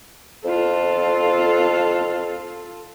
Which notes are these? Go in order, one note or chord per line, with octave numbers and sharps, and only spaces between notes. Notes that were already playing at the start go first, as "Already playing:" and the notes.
F2 F4 A4